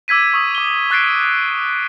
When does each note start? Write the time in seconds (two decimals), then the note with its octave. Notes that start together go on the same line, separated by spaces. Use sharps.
0.08 D6 E6 G#6 B6 D#7
0.34 C#6 D#6
0.55 D6 G7
0.90 C#6 F#6 A6 C7 D7